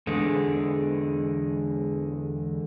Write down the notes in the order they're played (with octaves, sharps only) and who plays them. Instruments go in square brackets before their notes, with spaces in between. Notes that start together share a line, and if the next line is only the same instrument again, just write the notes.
[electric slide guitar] E2 D3 G#3